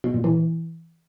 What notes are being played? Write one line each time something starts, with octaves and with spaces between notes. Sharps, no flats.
B2
A#2
E3